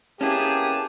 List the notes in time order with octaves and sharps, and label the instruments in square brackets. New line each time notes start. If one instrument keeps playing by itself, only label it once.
[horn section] A#3 B3 A5 [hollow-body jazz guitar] C#4 E4 [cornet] G4 [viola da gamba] G#4